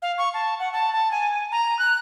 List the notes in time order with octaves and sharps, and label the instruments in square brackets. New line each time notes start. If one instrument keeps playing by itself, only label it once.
[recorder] F5
C#6
A5
F#5
A5
A5
G#5
A#5
F#6